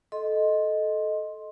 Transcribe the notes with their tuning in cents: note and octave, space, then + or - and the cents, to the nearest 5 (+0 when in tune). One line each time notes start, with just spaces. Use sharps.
A4 -15 D#5 +0 C6 +10